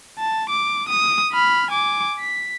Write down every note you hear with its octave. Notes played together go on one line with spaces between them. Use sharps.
A5
D6
D#6
B5 F6
G#5 D6
B6